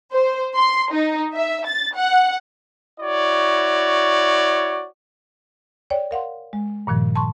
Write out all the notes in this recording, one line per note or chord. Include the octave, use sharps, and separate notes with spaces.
C5
C6
D#4
E5
A6
F#5
E4 F#4 C#5 D5
C#5 D5 G5
A#4 F5 F#5 C6
G#3
G2 A#2 D#3 F3
A5 C6 C#6